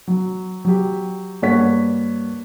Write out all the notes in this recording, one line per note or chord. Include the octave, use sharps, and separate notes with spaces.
F#3
F#3 G4
G2 A#3 C#5 F#5 B6